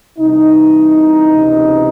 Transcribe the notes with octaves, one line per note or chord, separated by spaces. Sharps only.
C2 C3 E3 D#4
C#2 C3 E3